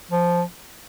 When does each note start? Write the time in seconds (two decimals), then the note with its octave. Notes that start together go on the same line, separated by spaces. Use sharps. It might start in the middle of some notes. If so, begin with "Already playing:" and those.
0.11 F3